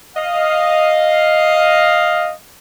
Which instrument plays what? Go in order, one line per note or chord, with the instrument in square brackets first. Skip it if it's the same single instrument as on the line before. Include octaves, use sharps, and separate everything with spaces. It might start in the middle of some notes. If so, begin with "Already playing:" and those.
[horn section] D#5 F5